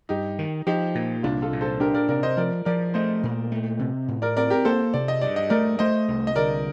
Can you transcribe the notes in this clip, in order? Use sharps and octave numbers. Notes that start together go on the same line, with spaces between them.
G2 D#4 G4
D#3
F3 D#4 G4
A#2
C2 D4 F4
F4 A4
A#2
A4 C5
D4 G4 A#4
A#4 D5
C3 A#4 D5
C5 D#5
F3 A#4 D5
F3 A#4 D5
A3 C5 D#5
A#2
A3
C3
A2
A#4 D5
C4 A#4 D5
G4 A#4
A#3 A4 C5
C3 D5
D#5
G2 D5
D#5
A3 A#4 D5
A3 C5 D#5
C2
D#5
D3 A#4 D5